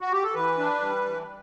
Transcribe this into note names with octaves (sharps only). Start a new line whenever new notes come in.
F#4
G4
A4
E3 B4
D4
G3
E3